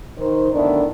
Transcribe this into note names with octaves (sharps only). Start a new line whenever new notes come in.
D#3 D#4 C5
D2 D#3 B3 D4 E4 A4